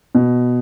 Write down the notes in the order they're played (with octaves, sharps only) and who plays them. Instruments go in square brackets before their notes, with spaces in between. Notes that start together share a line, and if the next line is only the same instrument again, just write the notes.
[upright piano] B2